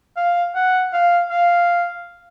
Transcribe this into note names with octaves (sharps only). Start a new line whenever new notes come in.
F5
F#5
F5
F5